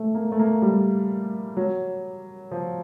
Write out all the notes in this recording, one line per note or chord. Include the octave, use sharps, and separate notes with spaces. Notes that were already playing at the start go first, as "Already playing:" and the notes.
Already playing: A3
A#3
A3
A#3
G3
F#3
F3